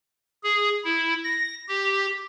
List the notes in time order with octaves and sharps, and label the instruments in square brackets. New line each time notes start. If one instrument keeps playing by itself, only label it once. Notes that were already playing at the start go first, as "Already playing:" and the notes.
[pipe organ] G#4
E4
A#6
G4